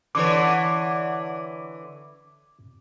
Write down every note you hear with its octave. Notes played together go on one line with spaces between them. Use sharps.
D3 E3 C#5 D6